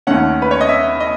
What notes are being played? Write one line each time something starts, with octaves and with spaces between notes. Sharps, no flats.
D#2 D#3 A3 C#4 F#5
B4
C#5
D#5
E5
D#5